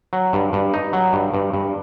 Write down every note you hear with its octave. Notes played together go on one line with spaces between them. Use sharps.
F#3
G2
G2
D#4
F#3
G2
G2
G2